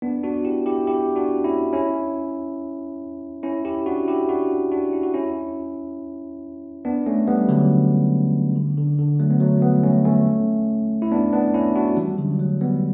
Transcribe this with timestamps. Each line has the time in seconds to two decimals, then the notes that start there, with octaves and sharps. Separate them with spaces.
0.02 B3 D4
0.23 D4 F#4
0.45 E4 G4
0.66 E4 G4
0.87 E4 G4
1.16 D4 F#4
1.44 C#4 E4
1.73 C#4 E4
3.43 C#4 E4
3.65 E4 G4
3.86 D4 F#4
4.08 E4 G4
4.29 D4 F#4
4.71 D4 F#4
4.93 E4
5.03 F#4
5.14 C#4 E4
6.85 B3 D4
7.06 A3 C#4
7.27 G3 B3
7.49 D3 F#3
8.55 D3
8.77 D3
8.98 D3
9.20 F#3 A3
9.31 B3
9.40 F#3 A3
9.62 G3 B3
9.84 A3 C#4
10.05 A3 C#4
11.02 E4
11.12 B3 D4
11.33 B3 D4
11.54 C#4 E4
11.75 D4 F#4
11.97 E3 G3
12.18 D3 F#3
12.39 F#3 A3
12.61 G3 B3